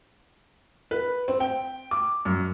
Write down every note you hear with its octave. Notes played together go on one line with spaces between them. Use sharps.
B4
C4
G5
D6
F#2